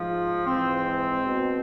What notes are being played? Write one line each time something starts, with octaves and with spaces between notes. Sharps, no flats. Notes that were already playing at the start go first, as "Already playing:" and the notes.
Already playing: G#2 F3
G#2 E3 C4
B2